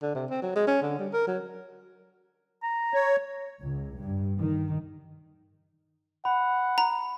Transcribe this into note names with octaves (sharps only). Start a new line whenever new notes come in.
D3
C3
C4
F#3
G#3
C#4
D3
G3
A#4
F#3
A#5
C#5
C#2
G2
D#3
F#5 B5
A#5